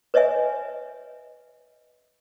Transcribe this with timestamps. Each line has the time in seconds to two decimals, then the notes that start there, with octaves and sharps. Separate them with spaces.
0.14 B4 C#5 D#5 E5 G#5